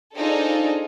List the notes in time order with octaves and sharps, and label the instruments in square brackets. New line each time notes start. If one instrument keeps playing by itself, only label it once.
[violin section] D4 D#4 F4 G#4 A4 C5